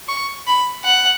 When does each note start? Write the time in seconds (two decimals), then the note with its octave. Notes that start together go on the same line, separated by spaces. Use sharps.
0.08 C#6
0.47 B5
0.84 F#5